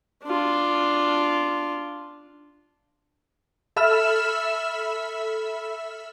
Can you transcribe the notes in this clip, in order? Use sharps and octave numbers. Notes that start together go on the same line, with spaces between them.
D4 F4
A4 E5 B5 E6 F6 E7